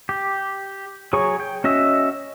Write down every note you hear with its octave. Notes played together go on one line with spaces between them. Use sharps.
G4
F#3 G#4 C#5 C#6
G5
C#4 F#4 D#5 E5